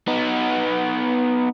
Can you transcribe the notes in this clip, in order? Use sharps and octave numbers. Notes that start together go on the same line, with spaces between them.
B3 D#4